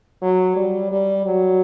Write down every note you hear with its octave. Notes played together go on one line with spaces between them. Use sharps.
F#3
G3
G3
F#3